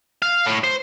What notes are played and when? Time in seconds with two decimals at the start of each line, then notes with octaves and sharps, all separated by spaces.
0.22 F5
0.46 A2
0.64 C5